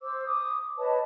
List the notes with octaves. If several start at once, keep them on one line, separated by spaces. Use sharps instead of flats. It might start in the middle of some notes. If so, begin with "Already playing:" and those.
C5 D6 E6
D6 D#6
B4 C#5 D#5 A5